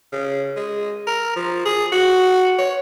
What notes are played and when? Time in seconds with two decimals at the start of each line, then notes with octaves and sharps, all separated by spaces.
0.12 C#3
0.56 G#3
1.07 A#4
1.36 F3
1.65 G#4
1.92 F#4
2.59 C#5